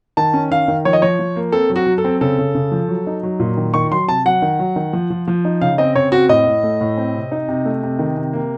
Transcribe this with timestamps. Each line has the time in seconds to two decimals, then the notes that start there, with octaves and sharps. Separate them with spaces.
0.17 D#3 A5
0.33 C#4
0.51 D#3 F5
0.68 D#3
0.85 F3 C#5
0.93 D#5
1.02 F3 C#5
1.19 F3
1.36 A#3
1.52 C4 A4
1.70 F#3
1.76 F#4
1.86 F#3
1.98 A4
2.04 C4
2.21 C#3 A4
2.38 C#3
2.55 C#3
2.72 F3
2.89 F#3
3.07 D#4
3.23 F#3
3.40 A#2
3.57 D#3
3.74 D#3 C#6
3.92 F#3 C6
4.08 C3 A5
4.25 F#3 F#5
4.42 D#3
4.59 F#3
4.76 D#3
4.93 F3
5.10 F3
5.28 F3
5.45 D#4
5.61 C#3 F5
5.78 C4 D#5
5.95 C#3 C#5
6.12 C4 F#4
6.29 A2 D#5
6.47 A2
6.63 A3
6.81 A2
6.97 C4
7.14 C3
7.32 D#4
7.48 C3
7.65 A3
7.83 C3
7.99 D#3
8.17 C3
8.33 A#3